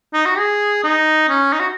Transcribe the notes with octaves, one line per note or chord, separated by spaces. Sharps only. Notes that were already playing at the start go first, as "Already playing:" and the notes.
D#4
F#4
G#4
D#4
C#4
D#4
F#4